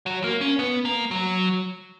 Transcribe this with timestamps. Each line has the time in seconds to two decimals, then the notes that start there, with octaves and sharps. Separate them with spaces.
0.06 F#3
0.24 A#3
0.41 C#4
0.59 B3
0.85 A#3
1.11 F#3